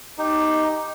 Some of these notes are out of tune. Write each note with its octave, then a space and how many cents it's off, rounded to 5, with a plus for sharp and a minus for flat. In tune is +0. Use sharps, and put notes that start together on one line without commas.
D#4 +0 G4 +0